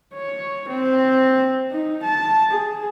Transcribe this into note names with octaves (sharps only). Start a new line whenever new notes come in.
C#5
C4
D#4
A5
G#4